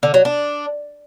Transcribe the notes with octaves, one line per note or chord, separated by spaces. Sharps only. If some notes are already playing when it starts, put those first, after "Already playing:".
D3
F#3
D4